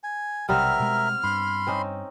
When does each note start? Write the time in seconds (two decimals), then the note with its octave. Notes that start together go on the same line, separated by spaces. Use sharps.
0.03 G#5
0.49 B1 C3 G3 B3 C4 A#4 E5 F6
0.80 B2 G#3
1.23 G2 B5 C6
1.67 C4 C#4 D#4